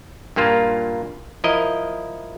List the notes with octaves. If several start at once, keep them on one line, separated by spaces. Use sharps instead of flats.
G2 A#2 A#3 F4 F5
F3 E4 A#4 D#5